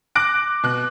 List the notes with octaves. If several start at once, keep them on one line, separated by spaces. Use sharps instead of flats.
D6 F#6 A#6 D7
B2 F#6